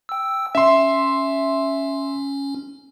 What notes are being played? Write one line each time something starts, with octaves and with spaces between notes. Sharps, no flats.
G5 E6
C#4 E5 C6